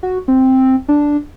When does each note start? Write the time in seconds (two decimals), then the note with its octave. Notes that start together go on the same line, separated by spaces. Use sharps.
0.03 F#4
0.28 C4
0.88 D4